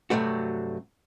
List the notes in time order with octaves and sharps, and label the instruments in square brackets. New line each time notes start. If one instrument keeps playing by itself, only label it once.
[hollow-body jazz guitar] G2 C3 F#3 A3 F#4